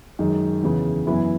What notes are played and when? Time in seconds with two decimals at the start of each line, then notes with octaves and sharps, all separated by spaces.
0.19 F#2 D#3 G#3
0.63 E2 C#3 E3
1.07 F#2 E3 B3 E4